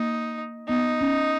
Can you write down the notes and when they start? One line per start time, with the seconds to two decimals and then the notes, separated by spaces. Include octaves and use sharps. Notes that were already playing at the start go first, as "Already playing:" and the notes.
Already playing: A#3 D#4
0.68 B3 D#4
1.01 C#4